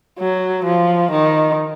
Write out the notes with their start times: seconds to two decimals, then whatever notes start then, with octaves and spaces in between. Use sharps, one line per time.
0.19 F#3
0.65 F3
1.11 D#3